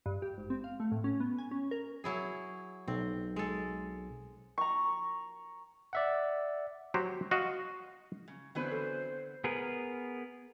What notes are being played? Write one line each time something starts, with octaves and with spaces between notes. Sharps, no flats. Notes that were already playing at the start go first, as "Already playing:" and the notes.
G2
G4
G#1
C4
F5
A3
A2
C#4
B3
G#5
C#4
A#4
F#3 E4 G#4
B1 C4
G#3 A4
A#5 C#6
D5 E5 F#5
F#3 F#4 G4 C5
F#4 D#5 F5
C#3
D3 E3 F#3 B3 C4 B4 C5
A4
B3 G#4 A#4 B4